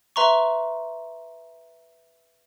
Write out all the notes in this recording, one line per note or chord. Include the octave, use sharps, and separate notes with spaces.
B4 E5 A#5 C6 C#6